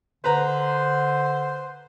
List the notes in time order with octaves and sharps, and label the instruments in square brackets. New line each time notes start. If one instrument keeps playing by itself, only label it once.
[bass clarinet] D3 [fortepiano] B4 A#5 [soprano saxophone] C5